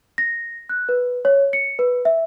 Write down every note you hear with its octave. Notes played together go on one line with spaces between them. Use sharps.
A#6
F#6
B4
C#5
C#7
B4
E5